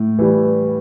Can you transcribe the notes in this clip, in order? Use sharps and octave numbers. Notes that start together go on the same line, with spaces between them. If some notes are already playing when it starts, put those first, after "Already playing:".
Already playing: A2
E3 G3